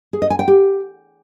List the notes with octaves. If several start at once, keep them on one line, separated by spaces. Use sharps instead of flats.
G#4
D#5
G#5
G5
G4